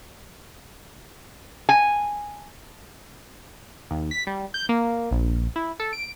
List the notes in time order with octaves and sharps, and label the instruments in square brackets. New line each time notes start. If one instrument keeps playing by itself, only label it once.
[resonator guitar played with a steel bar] G#5
[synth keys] D#2
B6
G3
G6
A#3
A#1
E4
A4
D7